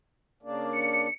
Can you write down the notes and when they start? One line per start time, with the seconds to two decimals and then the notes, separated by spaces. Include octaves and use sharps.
0.43 C#3 A#3 D4
0.73 C#7